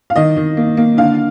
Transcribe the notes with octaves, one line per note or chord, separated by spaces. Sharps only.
F5
D#3 D#5
D#3
A#3
A#3
D3 F5